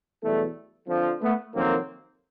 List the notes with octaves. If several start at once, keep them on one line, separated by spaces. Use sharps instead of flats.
E2 B2 F#3 G3 A3
F2 D3 F3
A3 B3
F2 C3 D#3 F#3 A#3 C4